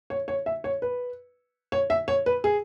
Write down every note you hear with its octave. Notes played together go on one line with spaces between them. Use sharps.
C#5
C#5
E5
C#5
B4
C#5
E5
C#5
B4
G#4